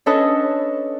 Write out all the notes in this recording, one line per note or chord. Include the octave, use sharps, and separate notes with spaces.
C#4 D4 A4 B4 C#5 D#5